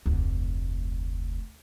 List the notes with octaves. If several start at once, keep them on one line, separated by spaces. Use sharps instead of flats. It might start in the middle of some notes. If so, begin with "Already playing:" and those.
F1 D2